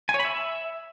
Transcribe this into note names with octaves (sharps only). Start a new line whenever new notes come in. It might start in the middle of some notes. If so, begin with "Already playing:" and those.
G#5
C#5
B5
E5